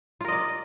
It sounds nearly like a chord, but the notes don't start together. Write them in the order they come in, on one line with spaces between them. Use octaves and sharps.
F4 A#4 D#5 D5